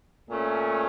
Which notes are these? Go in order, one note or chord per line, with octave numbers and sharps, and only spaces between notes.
A#2 A3 C#4